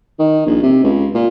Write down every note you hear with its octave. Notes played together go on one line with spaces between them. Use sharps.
D#3
A#1
C3
C#2
A#2